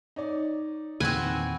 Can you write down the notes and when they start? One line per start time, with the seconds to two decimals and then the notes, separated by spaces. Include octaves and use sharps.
0.16 D#4 C#5 D5
1.00 E2 A#2 D#3 C4 F#4 B4 G#5